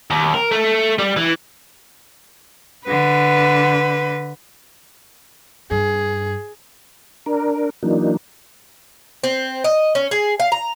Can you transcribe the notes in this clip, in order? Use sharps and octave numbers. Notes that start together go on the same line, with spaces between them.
D#2
A#4
A3
G3
E3
D3 B4
G2 G#4
D4 A#4
E3 F#3 A#3 D4 D#4
C4
D#5
C#4
G#4
F5
A#5